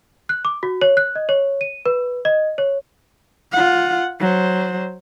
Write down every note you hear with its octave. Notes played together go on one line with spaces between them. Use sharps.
F#6
D6
F#4
C#5
F#6
D#5
C#5
D#7
B4
D#5
C#5
F4 F#5
F#3 C5